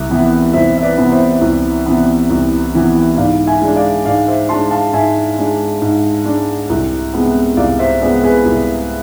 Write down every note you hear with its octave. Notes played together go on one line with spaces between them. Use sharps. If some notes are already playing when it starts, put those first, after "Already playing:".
Already playing: C2 E5
C3 E3 B3
C2 C5 E5
E5
B4 D5
C3 E3 B3
C5 E5
C2
C3 E3 B3
C2
C3 E3 B3
G#2 D5 F5
E5 G#5
G#3 D4
D5 F5
G#2 D5 F5
C5 E5
G#3 D4 A5 C6
F5 A5
G#2 E5 G#5
G#3 D4
G#2
G#3 D4
C2
C3 G#3 B3
C2 D5 F5
C5 E5
C3 G#3 B3 B4 D5
G#4 B4
C2